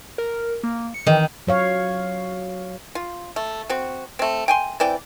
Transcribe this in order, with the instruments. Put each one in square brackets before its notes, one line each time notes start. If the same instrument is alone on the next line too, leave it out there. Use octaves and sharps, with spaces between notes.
[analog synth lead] A#4
A#3
C#7
[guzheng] D#3 [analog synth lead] E3
[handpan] F#3 C#5 F5
[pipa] F4
A3
C4 F#4
A3 C4
G5 G#5 C6
E3 C4 D5 G5